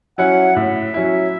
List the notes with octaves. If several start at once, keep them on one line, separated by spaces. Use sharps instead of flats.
F#3 C#4 E4 F#5
A2 E5
F#3 C#4 E4